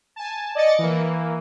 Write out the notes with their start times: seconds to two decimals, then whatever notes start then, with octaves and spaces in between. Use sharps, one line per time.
0.16 G#5 A5
0.55 D5 D#5 A6 C#7
0.79 E3 A#3